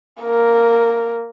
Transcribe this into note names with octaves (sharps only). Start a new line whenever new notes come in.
A#3 A#4